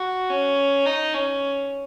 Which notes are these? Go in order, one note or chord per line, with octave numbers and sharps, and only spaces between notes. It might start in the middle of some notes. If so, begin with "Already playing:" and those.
Already playing: F#4
C#4
D#4
C#4